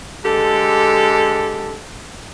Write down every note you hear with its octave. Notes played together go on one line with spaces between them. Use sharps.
D3 G#3 G4 A4